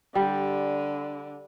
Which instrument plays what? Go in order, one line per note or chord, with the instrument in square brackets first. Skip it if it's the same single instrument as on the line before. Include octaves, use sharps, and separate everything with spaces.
[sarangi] D3 [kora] G3